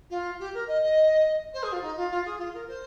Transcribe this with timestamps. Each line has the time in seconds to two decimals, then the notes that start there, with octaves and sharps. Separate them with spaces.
0.10 F4
0.39 G4
0.53 A#4
0.67 D#5
0.82 D#5
1.53 C5
1.63 G#4
1.72 F4
1.81 D#4
1.96 F4
2.11 F4
2.25 G#4
2.39 F4
2.53 A#4
2.67 C5